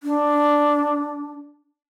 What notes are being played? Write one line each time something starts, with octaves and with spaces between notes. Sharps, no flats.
D4